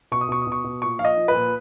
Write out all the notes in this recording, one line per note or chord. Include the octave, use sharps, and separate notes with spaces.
B2 C#6
D#6
B2 C#6
D#6
B2
C#6
B2
A#2 C#6
F3 F5
D#5
F3
B4
A#2